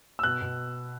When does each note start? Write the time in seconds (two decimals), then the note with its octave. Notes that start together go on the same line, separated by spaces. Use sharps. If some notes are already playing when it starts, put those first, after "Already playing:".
0.19 E6
0.23 B2 F#6
0.41 B2